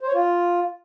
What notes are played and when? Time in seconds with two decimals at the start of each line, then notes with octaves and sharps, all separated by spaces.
0.01 C5
0.07 C#5
0.14 F4